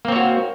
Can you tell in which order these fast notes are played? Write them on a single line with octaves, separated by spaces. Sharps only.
A#3 C4 C#5 F#4